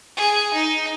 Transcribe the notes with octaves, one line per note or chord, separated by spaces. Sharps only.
G#4
D#4